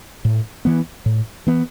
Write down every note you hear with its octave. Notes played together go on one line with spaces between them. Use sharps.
A2
E3 B3
A2
E3 B3